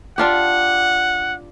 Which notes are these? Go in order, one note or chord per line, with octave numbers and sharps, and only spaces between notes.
D4 F4 G4 F#5